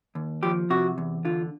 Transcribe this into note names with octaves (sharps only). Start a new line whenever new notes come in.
D#2
F3 G4
C3 F#4
E2
D3 F4